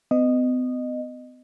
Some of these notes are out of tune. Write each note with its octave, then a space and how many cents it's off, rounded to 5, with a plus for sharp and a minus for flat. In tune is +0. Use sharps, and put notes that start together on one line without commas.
B3 +45 D#5 -15